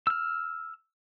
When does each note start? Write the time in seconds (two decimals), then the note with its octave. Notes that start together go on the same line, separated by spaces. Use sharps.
0.07 E6 F6